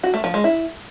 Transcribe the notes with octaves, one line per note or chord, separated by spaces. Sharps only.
F#4
A3
F3
G#3
E4